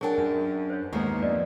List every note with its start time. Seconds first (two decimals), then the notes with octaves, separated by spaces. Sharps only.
0.01 F#3 D4 G#4 A#4 G5 G#5
0.18 F#2
0.70 C5 C#5
0.93 D#2 G#2 G#3 A#3 B3 G4
1.22 F2 D5 D#5